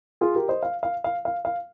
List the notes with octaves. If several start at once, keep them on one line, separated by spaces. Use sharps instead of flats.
F4 G#4
G4 A#4
C5 D#5
F5
F5
F5
F5
F5